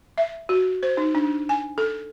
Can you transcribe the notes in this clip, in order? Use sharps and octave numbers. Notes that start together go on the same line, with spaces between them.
E5
F#4
C5
D#4
D4
G#5
A4